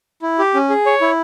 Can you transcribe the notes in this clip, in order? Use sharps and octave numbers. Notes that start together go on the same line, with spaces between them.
E4
G4
C#4
G#4
C#5
E4